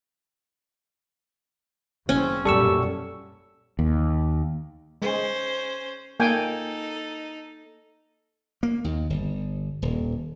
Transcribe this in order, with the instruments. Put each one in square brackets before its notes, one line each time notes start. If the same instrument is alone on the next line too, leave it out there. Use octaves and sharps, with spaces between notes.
[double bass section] F#1 C4 [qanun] C#4
[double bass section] B1 F#2 A#2 [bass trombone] G3 [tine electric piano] A4 C#6 E6
[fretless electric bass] D#2
[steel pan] G#3 [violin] C#4 C5
[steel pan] A#3 G5 G#5 [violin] D#4 A4
[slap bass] A#3
D#2
G1
D#1